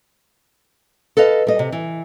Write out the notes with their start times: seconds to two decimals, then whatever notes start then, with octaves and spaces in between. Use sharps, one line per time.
1.17 A4 B4 D#5 F5
1.47 G3 D#5
1.59 C3
1.72 E3